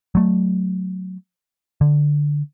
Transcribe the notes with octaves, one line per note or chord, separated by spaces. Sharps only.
F#3 A3
D3